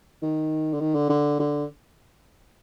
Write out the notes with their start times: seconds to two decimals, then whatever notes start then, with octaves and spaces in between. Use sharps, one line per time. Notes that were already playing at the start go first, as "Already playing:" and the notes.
0.22 D#3
0.73 D3
0.80 D#3
0.94 D3
1.09 D3
1.39 D3